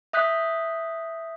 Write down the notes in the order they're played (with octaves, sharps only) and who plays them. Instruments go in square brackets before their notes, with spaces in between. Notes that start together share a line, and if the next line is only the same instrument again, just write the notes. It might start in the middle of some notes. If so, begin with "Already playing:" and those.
[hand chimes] E5 D#6 F#6 G6 B6